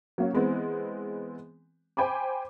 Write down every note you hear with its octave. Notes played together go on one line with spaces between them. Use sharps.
F#3 A#3 C#4
E3 G#3 B3 C4
C5 G5 G#5 B5 D6